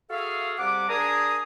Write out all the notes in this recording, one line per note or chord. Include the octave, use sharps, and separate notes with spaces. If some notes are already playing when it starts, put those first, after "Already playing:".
F#4 G#4 A4 E5 F5
C3 G3 F#5 D6
D4 G#4 A#4 G#5 A#5 D#6